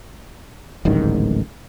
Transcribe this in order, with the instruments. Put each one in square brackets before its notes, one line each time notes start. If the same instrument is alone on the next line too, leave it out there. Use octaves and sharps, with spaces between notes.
[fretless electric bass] D1 A1 G#2 D#3